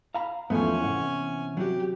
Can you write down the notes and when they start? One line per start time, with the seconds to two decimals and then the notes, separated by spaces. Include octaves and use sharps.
0.15 F5 A#5 B5
0.50 E2 E3 F3 A3 B3 C#4 G#5
0.83 C3 F#5
1.57 F#3 F#4 G4